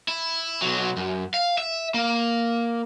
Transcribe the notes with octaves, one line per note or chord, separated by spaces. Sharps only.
E4
B1 F#3
F#2
F5
E5
A#3